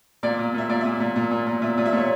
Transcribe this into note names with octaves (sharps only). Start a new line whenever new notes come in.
A#2 D5
A#2
A#2 E5
A#2 D5
A#2 E5
A#2
A#2
A#2
A#2
A#2 E5
A#2
E5
A#2 C#5